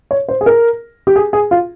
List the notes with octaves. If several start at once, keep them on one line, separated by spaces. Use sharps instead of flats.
C#5
C5
G#4
A#4
G4
G#4
G#4
F4